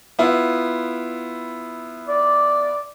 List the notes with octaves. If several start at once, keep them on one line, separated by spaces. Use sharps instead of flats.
B3 E4 F4
D5